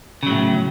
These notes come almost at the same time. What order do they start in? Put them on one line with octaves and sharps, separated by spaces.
C#3 F#3 A2